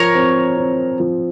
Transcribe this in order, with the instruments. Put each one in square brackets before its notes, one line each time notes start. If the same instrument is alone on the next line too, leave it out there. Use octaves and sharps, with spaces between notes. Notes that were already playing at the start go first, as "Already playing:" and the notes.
Already playing: [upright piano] F3 [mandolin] A#4 C#5
[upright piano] C4
C4
F3